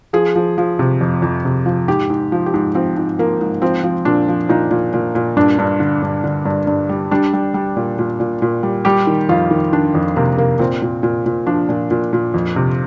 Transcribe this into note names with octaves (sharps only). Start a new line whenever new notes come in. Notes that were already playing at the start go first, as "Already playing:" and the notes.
F3 G#4
F3
F3
C3
F2
F2
C3
F3
G#2 G4
G#2
F3
G4
G#2
F3 C4
G#2
F3 A#3
G#2
F3 C4
F3
A#2 D4
F3
A#2 D#4
A#2
A#2
A#2
G2 D4
G2
D3
G2
D3
G2
G2
G3
G3 D4
G3
G3
A#2
A#2
A#2
A#2
G3
G3 G4
D#3
F2 F4
D#3
D#3 D4
F2
C3 A#3
C3 A#3
A#2 C4
A#2
A#2
A#2
F3 D4
A#2
A#2
A#2
F2
C3